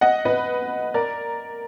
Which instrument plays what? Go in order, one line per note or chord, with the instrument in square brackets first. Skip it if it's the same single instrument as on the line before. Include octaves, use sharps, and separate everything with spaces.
[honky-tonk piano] D#5 F#5
B4 D#5
A#4 D5